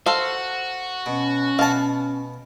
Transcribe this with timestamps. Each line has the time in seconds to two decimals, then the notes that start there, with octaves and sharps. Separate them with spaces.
0.06 F#4 A4 C5 F5
1.06 B2 C#4
1.59 B2 F5 F#5 A5